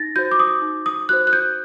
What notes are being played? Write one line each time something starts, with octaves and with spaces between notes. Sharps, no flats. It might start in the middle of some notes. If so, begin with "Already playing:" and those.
Already playing: D#4 A6 A#6
F#4 C5 G6
D6
D#6
D#4
D#6
F#4 C5 F#6
F#6
G6